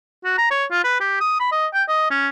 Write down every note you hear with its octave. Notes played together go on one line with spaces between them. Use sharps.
F#4
A#5
C#5
F4
B4
G4
D#6
B5
D#5
G5
D#5
C#4